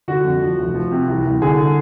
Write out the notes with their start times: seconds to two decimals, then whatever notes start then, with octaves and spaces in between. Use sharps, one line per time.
0.08 D3 F#4
0.24 F2
0.42 F3
0.58 F1
0.75 F3
0.91 C3
1.08 C2
1.25 C2
1.42 D3 G#4